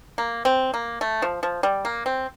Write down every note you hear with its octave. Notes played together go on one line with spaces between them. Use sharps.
A#3
C4
A#3
A3
F3
F3
G3
A#3
C4